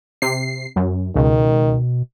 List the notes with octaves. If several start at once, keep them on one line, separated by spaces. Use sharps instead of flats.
C3 C7
F#2
C#2 B2 D#3